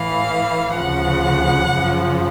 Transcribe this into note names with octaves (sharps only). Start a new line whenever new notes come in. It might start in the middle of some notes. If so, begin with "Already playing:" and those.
Already playing: A2 E3 F5
D2 C#3 F3 F#5
F#2 C#3 F3